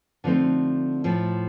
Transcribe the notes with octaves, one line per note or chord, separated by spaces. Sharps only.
D3 F3 A3 C4 D#4
A2 F3 A3